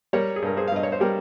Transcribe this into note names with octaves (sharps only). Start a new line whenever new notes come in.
G3 A#4 C#5
G#4
G2 A#4
G#4 C5
F5
G2 D#5
C#5
C5
G3 G4 A#4